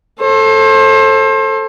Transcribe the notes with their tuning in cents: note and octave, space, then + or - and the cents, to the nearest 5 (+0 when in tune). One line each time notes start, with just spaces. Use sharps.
A4 +5 C5 +35